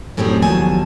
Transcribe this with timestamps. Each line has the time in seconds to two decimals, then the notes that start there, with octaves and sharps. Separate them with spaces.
0.17 F#2 A2 G3 C4 G4 G#4
0.42 D#2 B2 F3 F#3 G#5 A5